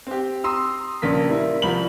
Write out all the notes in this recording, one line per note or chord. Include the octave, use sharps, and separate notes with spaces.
C4 G4
A#5 C6 D#6 E6
A#1 C#3 A#3 B6
G3 A#3 E4
C2 F3 B5 F#7